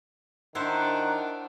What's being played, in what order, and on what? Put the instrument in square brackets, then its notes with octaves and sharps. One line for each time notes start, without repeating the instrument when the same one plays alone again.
[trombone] D#3 [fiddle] D4 [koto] E4 C5 [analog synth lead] F#5